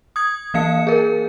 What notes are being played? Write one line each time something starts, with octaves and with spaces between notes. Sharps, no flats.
D#6 G#6
E3 A#3 F5 C#7
G#4 A#4